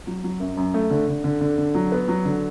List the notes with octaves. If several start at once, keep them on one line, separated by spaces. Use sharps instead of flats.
F#3
F#3
F#2
F#2
A3
D3
D3
D3
D3
D3
F#3
B3
F#3
D3